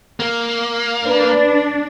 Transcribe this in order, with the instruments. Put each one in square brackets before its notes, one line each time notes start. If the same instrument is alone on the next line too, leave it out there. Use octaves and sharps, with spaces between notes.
[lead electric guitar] A#3
[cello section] D4 [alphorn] B4